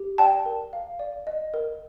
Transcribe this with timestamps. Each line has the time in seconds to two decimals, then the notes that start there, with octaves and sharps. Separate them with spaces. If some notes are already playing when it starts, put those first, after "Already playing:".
Already playing: G4
0.18 D5 G5 A5
0.46 A#4
0.73 F5
0.99 D5
1.27 D#5
1.54 A#4